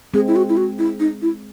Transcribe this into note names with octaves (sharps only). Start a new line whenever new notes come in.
G#3 C4 G#4
E4
F#4
E4
F#4
E4
D#4
E4